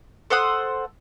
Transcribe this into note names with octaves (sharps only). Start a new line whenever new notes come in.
A4 C5 F#5 D#6